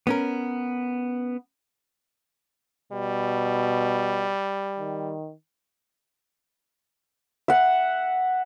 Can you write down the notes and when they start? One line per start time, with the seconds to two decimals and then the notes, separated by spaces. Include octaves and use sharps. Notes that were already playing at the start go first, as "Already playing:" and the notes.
0.07 B3 C#4 A#4
2.92 B2 G3
4.79 D#3
7.48 E5 F#5